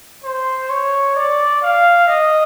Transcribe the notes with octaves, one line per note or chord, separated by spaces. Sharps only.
C5
C#5
D5
F5
D#5